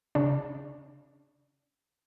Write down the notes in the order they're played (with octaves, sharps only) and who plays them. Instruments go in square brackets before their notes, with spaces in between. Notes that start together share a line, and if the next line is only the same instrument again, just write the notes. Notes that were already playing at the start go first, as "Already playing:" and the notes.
[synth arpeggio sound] C#3 D4